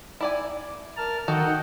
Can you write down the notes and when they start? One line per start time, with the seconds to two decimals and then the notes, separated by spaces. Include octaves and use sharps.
0.21 E4 D5 G#5
0.97 A#4 A5 F6
1.28 D#3 F#4 A4 D#5 F#5 G5